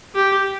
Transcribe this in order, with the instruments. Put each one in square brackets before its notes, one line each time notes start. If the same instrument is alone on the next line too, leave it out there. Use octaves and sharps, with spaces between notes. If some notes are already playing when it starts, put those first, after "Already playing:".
[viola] G4